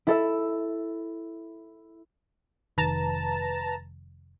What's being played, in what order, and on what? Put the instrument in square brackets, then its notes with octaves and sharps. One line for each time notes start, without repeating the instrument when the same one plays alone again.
[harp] E4 A4 E5
[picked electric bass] F1 D#3 [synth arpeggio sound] B4 A5 A#5